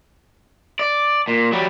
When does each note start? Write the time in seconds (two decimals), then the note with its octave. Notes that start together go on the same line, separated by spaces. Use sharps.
0.79 D5
1.28 A#2
1.52 F#3 G3